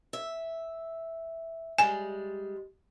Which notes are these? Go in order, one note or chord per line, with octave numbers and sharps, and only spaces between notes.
E5
G3 G#3 G#5